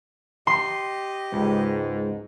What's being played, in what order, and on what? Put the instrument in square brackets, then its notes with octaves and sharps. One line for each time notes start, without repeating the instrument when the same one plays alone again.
[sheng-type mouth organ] G4 D#5 [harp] C6
[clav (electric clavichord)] C#2 [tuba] G#2